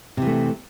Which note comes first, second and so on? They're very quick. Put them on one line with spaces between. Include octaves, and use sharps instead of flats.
C3 E3 A3